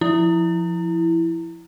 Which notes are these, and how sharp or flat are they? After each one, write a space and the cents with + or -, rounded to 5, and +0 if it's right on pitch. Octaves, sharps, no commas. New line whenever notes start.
F3 -10 E4 +0